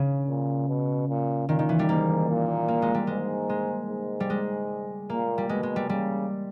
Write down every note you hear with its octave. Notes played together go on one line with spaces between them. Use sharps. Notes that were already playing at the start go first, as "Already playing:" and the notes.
Already playing: C#3
A#2
B2
A#2
A#2 D#3
D#3
E3
G3
G#2 A#3
A#2
A#3
G#3
G3
G#2 G#3
G#3
G#2
G3
G#3
A#2 A#3
G3
B2 G#3
G#3
G3
C#3 G3